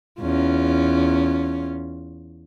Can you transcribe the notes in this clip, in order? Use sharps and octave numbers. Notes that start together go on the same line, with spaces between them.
E2 C#4 F4